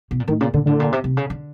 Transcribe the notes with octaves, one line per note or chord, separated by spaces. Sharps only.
B2
A#2
A2 D#3
A#2 C#3
A#2 D3
A2 D3
A#2
C3
C3
C#3
D3